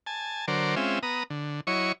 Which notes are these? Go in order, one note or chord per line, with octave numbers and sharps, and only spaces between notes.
G#5 A5
D3 F#3 A#4 C5 D5
G#3 C4 C#4 F4 E5
B3 A#5 D#6
D3
F#3 E4 C#5 D#5 C#6